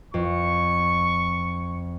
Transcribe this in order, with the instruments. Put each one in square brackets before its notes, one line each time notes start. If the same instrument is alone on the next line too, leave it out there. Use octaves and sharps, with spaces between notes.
[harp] F2 [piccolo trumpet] C#6